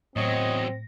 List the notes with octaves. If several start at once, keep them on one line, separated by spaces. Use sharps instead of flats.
E2 A2 F#3 C4 C#5 D#5 A#6